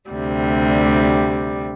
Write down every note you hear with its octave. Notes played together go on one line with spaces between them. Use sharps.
D2 C3 G3